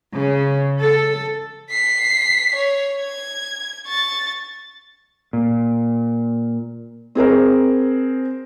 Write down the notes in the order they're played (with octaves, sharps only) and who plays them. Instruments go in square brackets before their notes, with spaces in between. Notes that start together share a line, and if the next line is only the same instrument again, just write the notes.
[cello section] C#3
A4
[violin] B6 C7
C#5
G#6
C#6 A6
[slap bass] A#2
[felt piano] C4 G#4 A#4 C5